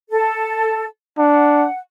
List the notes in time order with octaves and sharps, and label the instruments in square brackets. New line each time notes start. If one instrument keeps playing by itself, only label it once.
[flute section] A4
[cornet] D4 [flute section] F#5